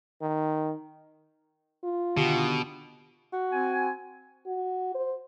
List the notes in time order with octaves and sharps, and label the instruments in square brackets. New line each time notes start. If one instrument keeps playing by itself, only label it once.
[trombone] D#3
[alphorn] F4
[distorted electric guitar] B2 [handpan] D3 D#3 G4
[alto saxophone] F#4
[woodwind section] C4 G#5
[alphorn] F#4
C5